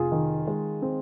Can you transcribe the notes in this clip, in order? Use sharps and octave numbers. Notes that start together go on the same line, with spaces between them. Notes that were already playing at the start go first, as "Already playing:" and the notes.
Already playing: F1 F4 G#4
D#3
G#3
C4